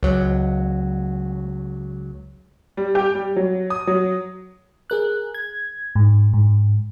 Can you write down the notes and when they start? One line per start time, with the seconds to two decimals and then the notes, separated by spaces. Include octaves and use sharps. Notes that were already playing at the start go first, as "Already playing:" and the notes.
0.03 C#2 F#3
2.77 G3
2.95 G4
3.15 G3
3.36 F#3
3.70 D#6
3.87 F#3
4.90 G#4 A#4 F#6
5.34 G#6
5.96 G#2
6.33 G#2